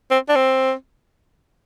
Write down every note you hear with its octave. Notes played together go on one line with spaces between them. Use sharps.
C4
D4
C4